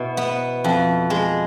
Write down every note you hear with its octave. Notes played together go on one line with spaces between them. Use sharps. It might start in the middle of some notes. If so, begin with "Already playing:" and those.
Already playing: B2 E4
B3
F2
G#3